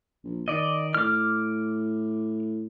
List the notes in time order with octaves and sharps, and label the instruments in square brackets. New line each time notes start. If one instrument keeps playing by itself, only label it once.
[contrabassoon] A#1
[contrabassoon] D#3 [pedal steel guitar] D5 D#5
[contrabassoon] A2 [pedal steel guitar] D6 F6